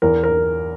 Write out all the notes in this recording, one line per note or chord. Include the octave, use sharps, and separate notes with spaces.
E2 A#4
A#4